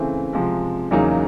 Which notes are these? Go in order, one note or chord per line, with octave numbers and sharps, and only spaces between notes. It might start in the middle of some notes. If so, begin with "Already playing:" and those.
Already playing: C#3 E3 A3 C4
C3 F3 G#3
E2 C#3 F#3 A#3 D#4